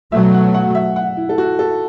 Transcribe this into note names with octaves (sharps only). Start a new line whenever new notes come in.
B2 F#3 A3 E5
F#5
F#5
E5
F#5
E4
A4
F#4
A4